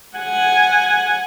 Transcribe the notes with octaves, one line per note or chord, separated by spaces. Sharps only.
F#5 G#5